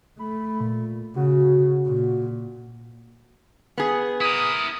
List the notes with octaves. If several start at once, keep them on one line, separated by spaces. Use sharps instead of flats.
A3 B5
A#2
C#3 F#4
A#2
B3 G#4
E4 A#4 D#6